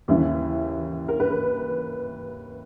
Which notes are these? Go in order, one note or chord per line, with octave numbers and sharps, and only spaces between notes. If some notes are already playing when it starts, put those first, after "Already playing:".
D#2 C#3 E3 E4
A#4
B4
A#4